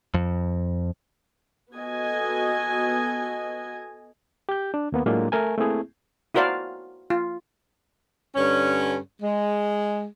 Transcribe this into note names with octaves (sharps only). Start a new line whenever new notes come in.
F2
B3 F#4 A4 D#5 G#5
G4 G6
D4
D#2 A#3 B3
A2 F#3 G#3 A#3 D4 F4
A3 A#4 G#5
A3 A#3 C4 E4 G#4
E4 F#4 A#4 C5 D5 F5
F4
G2 D3 C#4
G#3